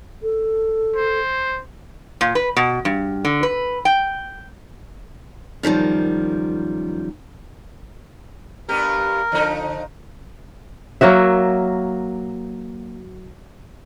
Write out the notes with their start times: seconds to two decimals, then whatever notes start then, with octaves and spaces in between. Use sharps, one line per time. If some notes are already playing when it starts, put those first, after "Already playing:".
0.23 A4
0.96 C5
2.21 A#2
2.35 B4
2.57 B2
2.85 G2
3.25 D3
3.43 B4
3.85 G5
5.63 F#2 D#3 F3 G3
8.69 G2 B3 G4 A#4
9.32 D3 F3 D#4
11.01 F#3 A#3 F#4 E5